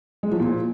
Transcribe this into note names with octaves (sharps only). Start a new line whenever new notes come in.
G#3
F3
A#2